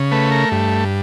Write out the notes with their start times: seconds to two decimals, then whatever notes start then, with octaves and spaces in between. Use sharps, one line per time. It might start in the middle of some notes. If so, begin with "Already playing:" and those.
Already playing: C#3
0.12 A3 B4
0.31 A#4
0.52 G2